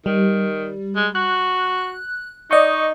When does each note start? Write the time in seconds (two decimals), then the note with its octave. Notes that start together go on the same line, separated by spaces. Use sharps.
0.06 D#3 G3
0.96 G#3
1.15 F#4 F#6
2.51 D#4 D5 D#5 C#6